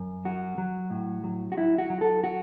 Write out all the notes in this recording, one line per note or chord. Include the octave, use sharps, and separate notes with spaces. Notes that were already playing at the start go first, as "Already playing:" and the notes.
Already playing: F#2
F#3 F#4
F#3
A2
F#3
F#4
F#3 E4
F#4
F#3
A4
F#4